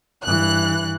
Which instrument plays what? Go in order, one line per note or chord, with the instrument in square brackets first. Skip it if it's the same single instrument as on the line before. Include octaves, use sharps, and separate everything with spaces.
[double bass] G2 E3 [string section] F#6